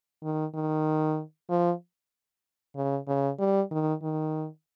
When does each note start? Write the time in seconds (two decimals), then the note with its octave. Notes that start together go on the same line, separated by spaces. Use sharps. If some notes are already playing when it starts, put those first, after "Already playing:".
0.23 D#3
0.55 D#3
1.50 F3
2.76 C#3
3.07 C#3
3.39 G3
3.71 D#3
4.02 D#3